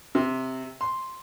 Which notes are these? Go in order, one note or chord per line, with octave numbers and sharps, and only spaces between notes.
C3
C6